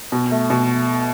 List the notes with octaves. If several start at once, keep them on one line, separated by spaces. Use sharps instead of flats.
B2
A3
B2